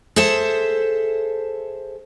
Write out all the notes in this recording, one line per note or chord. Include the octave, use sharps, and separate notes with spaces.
G#4 A4 C5 E5